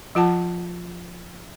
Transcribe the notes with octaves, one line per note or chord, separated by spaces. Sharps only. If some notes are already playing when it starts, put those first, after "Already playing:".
F3 F4 F#5 A5